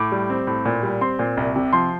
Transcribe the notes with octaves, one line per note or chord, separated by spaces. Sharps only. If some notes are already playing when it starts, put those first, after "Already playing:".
Already playing: A2 D6
G3
C4
A2
A#2
G3
C4 C6
A#2
C2
C3
F3 C6